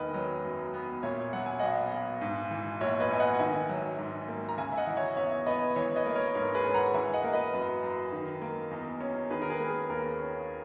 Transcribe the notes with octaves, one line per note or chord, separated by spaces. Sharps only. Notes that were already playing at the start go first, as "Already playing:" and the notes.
Already playing: E1 D#3 A#3 B4 D#5
F#3
F#2
B3
A#2 C#5 E5
F#3 F#5
G#5
B1 D#5 F#5
B1
G#2
E3
A#1 C#5 E5
B4 D#5
A#1 G#5
D#5 F#5
F#5
D#3 E5 G#5
F#3
G#2
A#3
A#5
C#3 E5 G#5
E5
D#5 F#5
E3
C#5 E5
E2 C#5 E5
B3 B4 D#5
E3 C#5 E5
B4 D#5
A#3
A#4 C#5
G#2 A#4 C#5
G#4 B4
C#4
F#5 A#5
E3 E5 G#5
D#5 F#5
A#3
B4 D#5
F#2
F#2
D#3
A#3
E2
C#4
D#3 G#4 B4
A#4
G#4 B4
A#3
G#4
D#2 A#4
C#4